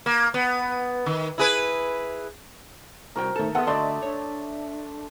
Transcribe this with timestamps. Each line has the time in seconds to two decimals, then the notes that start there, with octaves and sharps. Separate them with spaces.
0.06 A#3
0.34 B3
1.06 D#3
1.38 E4 G#4 B4
3.15 C2 F#4 A#4 C5 G5
3.36 D#3 A3 A4 A5
3.55 B3 G#4 A4 E5 F#5 C6 D#6
3.67 D2 A3 D4 D5 D#5 A5 C6 D6
4.02 D4 C#5